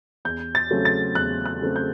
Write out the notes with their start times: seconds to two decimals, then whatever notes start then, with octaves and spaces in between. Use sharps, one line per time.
0.25 E2 G6
0.55 A6
0.70 C#3 F#3 A3 C4
0.85 A6
1.15 E2 F#6
1.46 F#6
1.61 C#3 F#3 A3 C4
1.76 G6